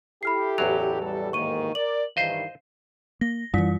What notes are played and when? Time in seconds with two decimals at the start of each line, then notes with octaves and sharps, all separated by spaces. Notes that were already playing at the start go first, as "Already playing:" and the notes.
0.23 E4 G4 A4 B5 F6 C7
0.58 A1 E2 F#3 F7
1.01 G3 A4
1.33 G#2 D#3 A#3 C#6 D#7
1.75 A#4 D5 F#7
2.17 G2 D#3 E3 C5 D#5 F5 C7
3.21 A#3 A#6
3.54 F#2 E3 G3 F4 B6